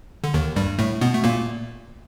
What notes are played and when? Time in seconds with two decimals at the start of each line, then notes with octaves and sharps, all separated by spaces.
0.24 D3
0.34 D#2 D#3
0.56 G2 G3
0.79 A2 A3
1.01 B2 B3
1.14 A3
1.24 A#2 A#3